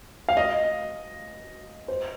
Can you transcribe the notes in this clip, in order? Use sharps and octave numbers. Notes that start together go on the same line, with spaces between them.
F5
D#5
C5